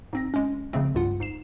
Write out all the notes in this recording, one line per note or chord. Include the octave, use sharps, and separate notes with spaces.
G#2 C4 A#6
G#3 C#4
C#3 F3 G#3 A3 C4
C2 G2 F4 F#5
G#2 C7 E7